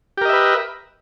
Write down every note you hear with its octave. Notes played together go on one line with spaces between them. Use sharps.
G4 A#4 B4 D#5 E5